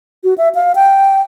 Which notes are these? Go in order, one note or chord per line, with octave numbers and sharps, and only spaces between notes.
F#4
E5
F5
G5